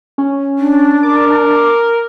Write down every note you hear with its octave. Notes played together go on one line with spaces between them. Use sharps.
C#4
D4
A#4 D6